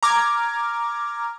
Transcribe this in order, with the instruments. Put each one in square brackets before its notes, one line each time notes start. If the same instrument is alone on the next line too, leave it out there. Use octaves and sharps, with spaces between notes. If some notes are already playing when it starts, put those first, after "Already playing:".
[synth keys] A#5 D6 F6 G#6